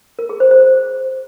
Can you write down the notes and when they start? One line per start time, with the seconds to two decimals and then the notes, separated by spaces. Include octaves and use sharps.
0.19 A#4
0.29 G#4
0.40 C5
0.51 C5